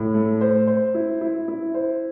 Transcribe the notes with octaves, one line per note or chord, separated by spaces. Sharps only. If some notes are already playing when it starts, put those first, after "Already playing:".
Already playing: A2
A3
C5
C5
E4
E4
E4
C5